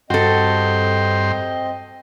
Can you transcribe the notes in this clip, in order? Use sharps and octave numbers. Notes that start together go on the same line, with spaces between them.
G2 C4 F#4 A4 D#5 G5 C6